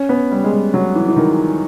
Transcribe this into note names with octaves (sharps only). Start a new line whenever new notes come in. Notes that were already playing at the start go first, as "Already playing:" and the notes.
Already playing: C#4
B3
G3
G#3
G3
F#3
E3
E3
D#3